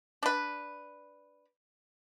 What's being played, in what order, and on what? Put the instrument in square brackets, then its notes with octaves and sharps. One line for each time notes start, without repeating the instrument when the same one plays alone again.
[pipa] D4 B4